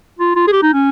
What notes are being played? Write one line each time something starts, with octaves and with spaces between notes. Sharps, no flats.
F4
F4
G#4
G4
D#4
C#4